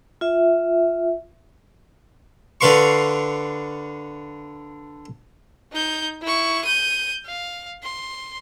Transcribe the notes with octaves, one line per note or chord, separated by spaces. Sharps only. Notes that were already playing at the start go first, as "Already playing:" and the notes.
F4 E5
D3 D4 B4 F5 C6 C#6
D#4 G6
E4 C#6
G6 D#7
F5
C6